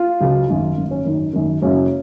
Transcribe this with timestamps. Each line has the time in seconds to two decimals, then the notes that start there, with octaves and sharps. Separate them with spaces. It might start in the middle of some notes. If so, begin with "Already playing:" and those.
Already playing: F4
0.20 C#2 C#3 F#3
0.48 G#1 F#2 D#3
0.77 G#1 F#2 D#3
0.91 C#4
1.06 G#1 F#2 D#3
1.33 G#1 F#2 D#3
1.62 F#1 F#2 C#3 F#3 C#4